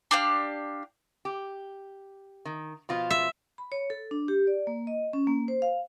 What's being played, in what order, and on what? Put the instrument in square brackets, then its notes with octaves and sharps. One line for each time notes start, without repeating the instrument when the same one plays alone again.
[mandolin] D4 G4 F5
[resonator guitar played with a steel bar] G4
D#3
B2 F3 F4
[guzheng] E5
[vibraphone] B5
C#5
A4
D4
G4
D5
A#3
D#5
C#4
A#3
C5
F5